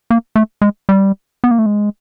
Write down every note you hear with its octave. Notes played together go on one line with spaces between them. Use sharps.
A#3
A3
G#3
G3
B3
A#3
A3
G#3